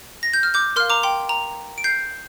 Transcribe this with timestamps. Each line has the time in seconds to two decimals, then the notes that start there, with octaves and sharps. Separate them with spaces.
0.23 A#6
0.33 G6
0.43 F6
0.54 D6 G6
0.76 A#4 F5 C6 F6
0.90 A#5 D6
1.03 G5 C6
1.29 A#5
1.78 D7
1.84 G6 C7